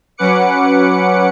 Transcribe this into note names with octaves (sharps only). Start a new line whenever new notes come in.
F#3 C#4 B4 F#5 D6 C#7